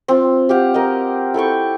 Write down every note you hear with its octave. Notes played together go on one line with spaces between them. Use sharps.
C4 F4
G4 F5 F#5
A#4 D#5
E4 A4 G5 C#6